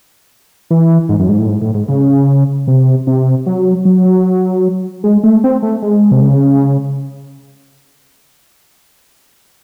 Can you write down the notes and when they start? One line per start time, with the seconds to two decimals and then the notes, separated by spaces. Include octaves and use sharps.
0.70 E3
1.09 G#2
1.19 F#2
1.29 G#2
1.39 A2
1.49 G#2
1.62 A2
1.74 G#2
1.89 C#3
2.67 C3
3.07 C3
3.46 F#3
3.85 F#3
5.04 G#3
5.24 A3
5.44 C4
5.63 A3
5.82 G#3
6.11 C3
6.22 C#3